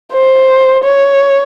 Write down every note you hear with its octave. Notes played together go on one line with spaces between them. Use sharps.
C5
C#5